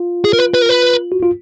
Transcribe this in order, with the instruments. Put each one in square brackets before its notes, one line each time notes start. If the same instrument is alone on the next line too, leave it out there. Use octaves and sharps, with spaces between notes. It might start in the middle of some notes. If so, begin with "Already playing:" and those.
Already playing: [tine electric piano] F4
[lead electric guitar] G#4
A#4
B4
B4
A#4
B4
[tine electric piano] F#4
F4